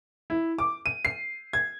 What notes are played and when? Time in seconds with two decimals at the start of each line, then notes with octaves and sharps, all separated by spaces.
0.30 E4
0.58 D6
0.86 D#7
1.05 C7
1.53 G#6